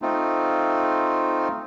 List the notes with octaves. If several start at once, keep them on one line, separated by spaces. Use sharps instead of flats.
A3 C4 D#4 F4